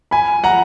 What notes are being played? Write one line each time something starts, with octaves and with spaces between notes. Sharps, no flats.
G#5 B5
F#5 A#5